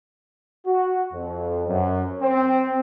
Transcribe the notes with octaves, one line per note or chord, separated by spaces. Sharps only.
F#4
F2
F#2
C4